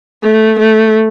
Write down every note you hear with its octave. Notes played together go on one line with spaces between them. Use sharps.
A3
A3